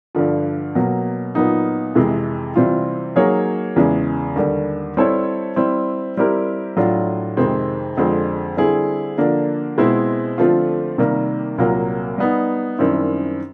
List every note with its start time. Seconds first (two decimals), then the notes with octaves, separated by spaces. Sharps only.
0.15 G2 D3 F3
0.75 B2 F#3 A#3
1.35 A#2 F#3 B3 D#4
1.95 F2 C3 E3 G#3
2.56 C3 E3 G3 C4 F4
3.16 F#3 A#3 D#4 G#4 C#5
3.76 E2 C#3 E3 G#3
4.36 D#2 D3 G3
4.97 G3 C4 E4 A4 C#5
5.56 G3 C4 E4
6.17 G3 C4 E4 G4 A#4
6.77 A2 F#3 A3 D4 F4
7.37 F2 C3 D#3 G#3 C4
7.97 F2 D3 F3 G#3 C4
8.57 D3 G3 C4 E4 G#4
9.18 D3 F3 A#3 D4
9.78 B2 G#3 C4 E4
10.38 D3 F3 A3 C4 F4
10.98 C3 D#3 G3 A#3
11.58 C2 A#2 F#3 A#3
12.18 G3 B3 D#4
12.78 F#2 D#3 G3 C4 E4